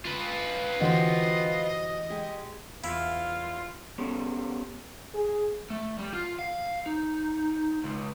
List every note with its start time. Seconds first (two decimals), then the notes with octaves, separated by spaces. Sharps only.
0.05 F4 B4
0.80 D3 E3 F#4 G4 C5 D#5
2.10 G#3 G4 G#4
2.84 E2 E4 F4 F5
3.98 B3 C#4 G4 A4 C#5
5.14 G#4
5.70 A3
5.99 G3
6.13 F4
6.39 F5
6.86 D#4
7.84 C#2